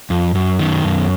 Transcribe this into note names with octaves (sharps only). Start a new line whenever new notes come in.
F2
F#2
D#3
F#2